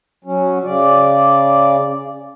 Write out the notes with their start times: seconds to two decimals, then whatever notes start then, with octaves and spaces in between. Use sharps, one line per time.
0.24 F#3 C#4
0.64 C#3 D5